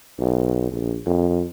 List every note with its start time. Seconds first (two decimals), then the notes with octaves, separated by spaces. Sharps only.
0.19 B1
0.71 A#1
1.06 F2